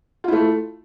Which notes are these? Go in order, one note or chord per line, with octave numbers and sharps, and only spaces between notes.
A3 E4 F4